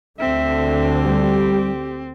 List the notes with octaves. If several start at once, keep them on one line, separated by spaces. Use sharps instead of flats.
D2 D3 C4 E5
G3 G4